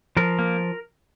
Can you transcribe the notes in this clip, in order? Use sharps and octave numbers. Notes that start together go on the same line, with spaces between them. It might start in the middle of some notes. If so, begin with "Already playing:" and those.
F3 A#4
A#3